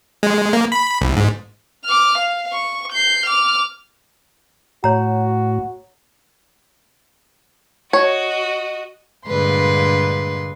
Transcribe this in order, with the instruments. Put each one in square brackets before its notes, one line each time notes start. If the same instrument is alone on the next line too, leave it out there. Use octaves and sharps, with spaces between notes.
[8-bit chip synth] G#3
A#3
B5
C2
G#2
[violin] D6 F6
F5
C#6
G6 C7
D6 F6
[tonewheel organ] A2 [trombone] F#4 [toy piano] C#5 A#5
[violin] F#4 D#5 [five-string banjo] C#5
[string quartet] G2 A#2 D3 G#3 B4 C6